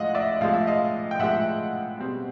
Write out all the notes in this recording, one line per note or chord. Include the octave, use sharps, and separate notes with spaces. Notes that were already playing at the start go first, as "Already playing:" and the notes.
Already playing: A2 F3 G#3 D#5 F5 F#5
D5 E5
A2 F3 G#3 F5
E5
D#5 F5
G5
A2 F3 G#3 E5 F#5
B2 G3 C4